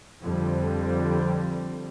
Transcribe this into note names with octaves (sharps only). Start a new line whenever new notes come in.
F2 D3 G3 C4